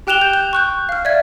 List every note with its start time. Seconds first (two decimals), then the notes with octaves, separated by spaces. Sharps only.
0.07 G4 G5 F#6 E7 F7 G7
0.21 G6
0.34 G6
0.53 C#6 F#6 G6
0.89 F5 F6
1.05 D5 E5 G#6